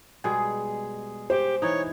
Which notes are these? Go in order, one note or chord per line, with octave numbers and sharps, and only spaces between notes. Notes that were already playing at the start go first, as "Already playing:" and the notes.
B2 G3 G#3 G#4
G4 C5
E3 D#4 C#5